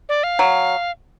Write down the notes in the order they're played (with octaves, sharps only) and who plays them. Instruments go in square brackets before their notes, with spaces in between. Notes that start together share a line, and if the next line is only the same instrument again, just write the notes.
[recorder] D5
F5
[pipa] F#3